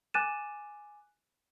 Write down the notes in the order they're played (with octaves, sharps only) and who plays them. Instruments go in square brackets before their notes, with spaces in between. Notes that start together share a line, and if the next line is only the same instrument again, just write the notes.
[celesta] G#5 D6 F#6 A6 D#7 E7